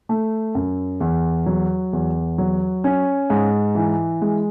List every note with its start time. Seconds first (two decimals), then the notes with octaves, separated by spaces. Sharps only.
0.09 A3
0.55 F#2
1.00 E2
1.46 F#3
1.93 E2
2.38 F#3
2.84 C#4
3.30 G#2
3.75 E3
4.22 G#3